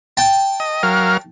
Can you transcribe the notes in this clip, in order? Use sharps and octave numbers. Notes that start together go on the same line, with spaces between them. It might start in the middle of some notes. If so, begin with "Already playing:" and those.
G5 A5
D#5
F#3 A#4 F5